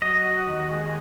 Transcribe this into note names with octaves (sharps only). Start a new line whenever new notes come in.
F#3 D#5
F#4
D#2
G#3